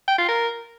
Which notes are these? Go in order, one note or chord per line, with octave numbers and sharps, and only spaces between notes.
G5
F4
A#4